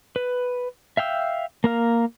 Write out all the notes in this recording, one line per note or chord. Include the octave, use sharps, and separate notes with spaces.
B4
E5 F5 G5 E6
A#3 A#4 F5